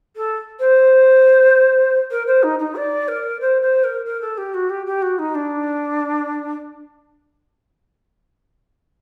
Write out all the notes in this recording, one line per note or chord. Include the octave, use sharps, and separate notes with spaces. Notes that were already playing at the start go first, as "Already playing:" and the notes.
A4
C5
A#4
C5
D#4
D#4
D5
A#4
C5
C5
A#4
A#4
A4
G4
F#4
G4
G4
F#4
D#4
D4